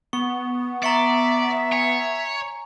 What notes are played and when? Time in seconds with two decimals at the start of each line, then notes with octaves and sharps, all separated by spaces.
0.13 B3 C#6
0.83 D5 E5 A#5 C#6 C#7
1.72 C#5 G#5